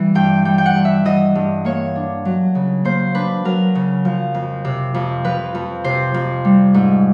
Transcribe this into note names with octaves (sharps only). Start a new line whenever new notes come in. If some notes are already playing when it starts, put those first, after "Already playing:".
Already playing: E3 G3
G2 G5
G3 G5
G5
F#5
G2
E5
E3 D#5
G2
A#3 C#5
D4
F#3
C#3
A#3 C5
D4 B4
F#3 A#4
C#3
F3
F2
C3
F2
F3 B4
F2
C3 C5
F2
G3
G#2